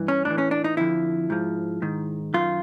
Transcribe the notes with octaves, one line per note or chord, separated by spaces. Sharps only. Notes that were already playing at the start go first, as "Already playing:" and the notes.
Already playing: G2 E3
C#4
A2 E3 D4
C#4
D4
D#4
F2 D3 F3 E4
G#2 F3
G#2 D#3
F#2 D#3 F4